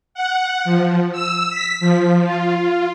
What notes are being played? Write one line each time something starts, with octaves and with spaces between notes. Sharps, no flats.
F#5
F3
E6
B6
F3
F4